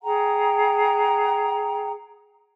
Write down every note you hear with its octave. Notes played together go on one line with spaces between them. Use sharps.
G#4 F#5 G5 A#5